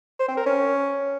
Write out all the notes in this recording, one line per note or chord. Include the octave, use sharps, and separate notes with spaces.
C5
C4
A#4
C#4